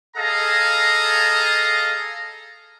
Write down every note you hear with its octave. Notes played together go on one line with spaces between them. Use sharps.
G#4 A4 D#5 F5 A#5